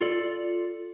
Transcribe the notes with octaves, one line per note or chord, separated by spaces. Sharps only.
F4 A4 D5